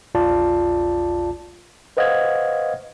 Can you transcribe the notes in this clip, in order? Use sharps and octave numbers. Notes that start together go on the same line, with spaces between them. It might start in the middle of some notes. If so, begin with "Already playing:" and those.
A#1 E2 F4 D5 A5
B4 C5 D#5 F5 F#5 G#6